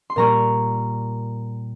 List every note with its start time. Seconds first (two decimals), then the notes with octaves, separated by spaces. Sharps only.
0.10 C6
0.16 A#2 G3 A#3 A#5 C#6